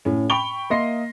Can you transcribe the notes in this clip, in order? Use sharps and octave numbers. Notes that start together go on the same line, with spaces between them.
A2 C#4
G5 B5 C#6 D7 F7 G7
A#3 D#5 E5 C6 A#6 C7